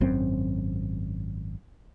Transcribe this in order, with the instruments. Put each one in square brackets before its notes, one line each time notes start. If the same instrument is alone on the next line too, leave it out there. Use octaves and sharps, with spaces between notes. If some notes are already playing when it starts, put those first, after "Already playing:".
[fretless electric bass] G#1 F#2 C4